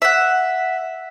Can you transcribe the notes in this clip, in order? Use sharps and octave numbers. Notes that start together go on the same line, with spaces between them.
E5 F#5